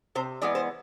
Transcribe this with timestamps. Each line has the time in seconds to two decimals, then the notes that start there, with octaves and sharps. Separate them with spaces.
0.15 C3 C5
0.42 E3 G#3 B3 D5
0.55 C5